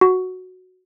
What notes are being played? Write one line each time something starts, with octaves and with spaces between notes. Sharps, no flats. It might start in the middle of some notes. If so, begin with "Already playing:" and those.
F#4